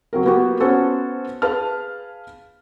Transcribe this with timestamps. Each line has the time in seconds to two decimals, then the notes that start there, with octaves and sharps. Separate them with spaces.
0.13 F#3 C4 A#4
0.25 A#3 B3 F#4 G4
0.60 B3 C#4 F#4 A4 C5
1.42 G#4 B4 F5 A5 F6